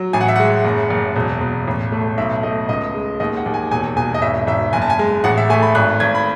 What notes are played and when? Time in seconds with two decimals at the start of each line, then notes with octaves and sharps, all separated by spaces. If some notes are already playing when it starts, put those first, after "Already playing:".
Already playing: F#3
0.13 A1 G#5
0.21 F#5
0.28 E5
0.36 G#3 F#5
0.65 F#1
0.90 F#1
1.16 E1
1.41 E1
1.67 A1
1.92 A3
2.17 B1 E5
2.43 A3 D#5
2.69 C#2 D#5
2.94 G#3
3.20 D#2 D#5
3.37 F#5
3.46 D#2
3.54 G#5
3.71 E1 G#5
3.97 E1 G#5
4.14 D#5
4.22 G#1 E5
4.47 G#1 E5
4.73 F#1 G#5
4.82 A5
4.90 G#5
4.99 G#3
5.24 A1 F#5
5.38 E5
5.50 A3 G#5
5.62 B5
5.75 G#1 F#6
6.00 G#1 G#6
6.15 B5